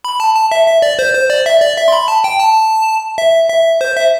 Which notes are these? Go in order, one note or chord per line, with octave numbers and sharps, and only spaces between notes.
B5
A5
A5
E5
E5
D5
C5
C5
D5
E5
D5
E5
C6
B5
A5
G5
A5
E5
E5
C5
E5